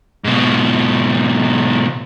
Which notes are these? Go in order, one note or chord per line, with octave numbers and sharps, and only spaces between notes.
G#2 B2